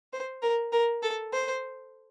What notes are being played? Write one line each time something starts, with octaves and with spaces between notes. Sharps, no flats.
C5
A#4
A#4
A4
C5